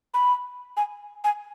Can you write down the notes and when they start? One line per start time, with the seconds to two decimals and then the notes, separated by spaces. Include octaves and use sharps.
0.14 B5
0.77 G#5
1.24 G#5